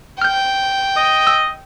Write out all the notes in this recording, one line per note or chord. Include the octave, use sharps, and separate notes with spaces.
G5 F6 G6
D#5
E6